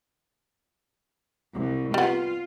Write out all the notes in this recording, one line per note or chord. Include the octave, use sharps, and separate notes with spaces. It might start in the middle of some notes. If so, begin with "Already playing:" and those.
C2
G3 B3 F4